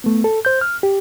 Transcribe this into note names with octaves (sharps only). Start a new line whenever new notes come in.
A3 B3
A4
C5 G6
F6
G4